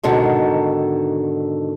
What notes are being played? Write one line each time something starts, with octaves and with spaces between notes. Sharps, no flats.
G#2 B2 D3 D#3